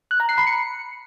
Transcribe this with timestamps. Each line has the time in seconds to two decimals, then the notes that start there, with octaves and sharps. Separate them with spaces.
0.11 F#6
0.20 A#5
0.29 C7
0.38 B5
0.47 C#7